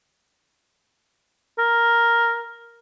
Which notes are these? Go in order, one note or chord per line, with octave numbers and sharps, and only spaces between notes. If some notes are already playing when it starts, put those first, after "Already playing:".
A#4